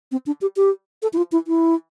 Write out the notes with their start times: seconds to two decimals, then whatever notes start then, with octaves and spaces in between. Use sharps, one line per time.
0.12 C4
0.26 D4
0.42 G4
0.56 G4
1.02 A4
1.13 E4
1.17 F4
1.32 E4
1.47 E4